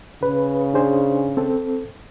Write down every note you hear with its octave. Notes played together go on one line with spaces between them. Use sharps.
C#3 B4
D4 G#4 C5
C4 A4